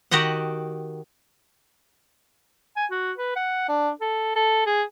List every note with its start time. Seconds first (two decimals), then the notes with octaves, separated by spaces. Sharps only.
0.11 D#3 F#4 G4 D#5 F#5
2.77 G#5
2.91 F#4
3.17 B4
3.36 F#5
3.69 D4
4.01 A4
4.36 A4
4.66 G#4